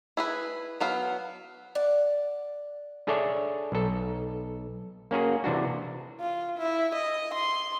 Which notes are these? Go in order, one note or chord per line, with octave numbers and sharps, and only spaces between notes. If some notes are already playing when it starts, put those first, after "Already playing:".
E4 G#4 B4
F#3 B3 F5
D5 F#5
D4 G#4 A4 C#5 D5 E5
B1 A4
A#3 C#4 F#4 G#4
C3 E3 D4 F#4
F4
E4
D#5
C6